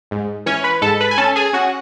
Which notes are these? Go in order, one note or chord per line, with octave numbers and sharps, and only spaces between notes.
G#2
E3 C#4 C#5
B4 B5
G#2 A4 A5
B4 B5
G#5
C#4 A4 A5
G#4 G#5
C#4 F#4 F#5